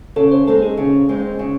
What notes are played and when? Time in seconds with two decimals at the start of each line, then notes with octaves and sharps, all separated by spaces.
0.16 C#3 A4
0.32 C5
0.47 G#3 C4 D#4 A4
0.62 G#4
0.77 C#3
1.09 G#3 C4 D#4
1.39 C#3